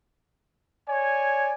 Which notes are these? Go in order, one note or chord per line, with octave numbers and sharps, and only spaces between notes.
C#5 D5 G#5